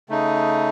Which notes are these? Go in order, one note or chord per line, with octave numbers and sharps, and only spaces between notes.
C#3 A3 D#4